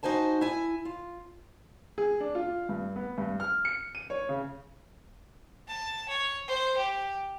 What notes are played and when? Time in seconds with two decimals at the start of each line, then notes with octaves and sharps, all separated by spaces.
0.03 D#4 F#4 C5 G#5 A5
0.41 E4 G#5
0.85 F4
1.98 G#4
2.20 D4
2.35 F4
2.69 G2
2.96 B3
3.18 G2
3.40 F6
3.65 C#7
3.95 D#7
4.10 C#5
4.29 C#3
5.67 A5
6.09 C#5
6.48 C5
6.77 G4